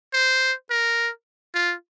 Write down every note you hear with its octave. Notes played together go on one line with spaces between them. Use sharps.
C5
A#4
F4